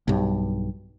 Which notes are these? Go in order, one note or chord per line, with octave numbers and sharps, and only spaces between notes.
B1 G2